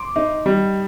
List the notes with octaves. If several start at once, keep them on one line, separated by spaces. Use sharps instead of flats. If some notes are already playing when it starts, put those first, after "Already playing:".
Already playing: C6 D6
D#4
G3